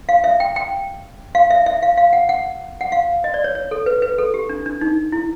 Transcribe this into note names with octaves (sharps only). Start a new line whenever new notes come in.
F5
E5
G5
G5
F5
E5
E5
F5
F5
F#5
F#5
F#5
F5
D#5
D5
C#5
C#5
A4
B4
B4
A4
G4
D4
D4
D#4
E4